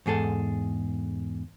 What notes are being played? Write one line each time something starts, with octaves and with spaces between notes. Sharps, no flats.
E2 G#2 G#4 A4